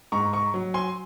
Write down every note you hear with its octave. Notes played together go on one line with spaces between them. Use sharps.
G#2 A#5 C#6
A#5 C#6
F#3
G#5 C6